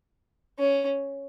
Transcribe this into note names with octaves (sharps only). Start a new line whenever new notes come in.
C#4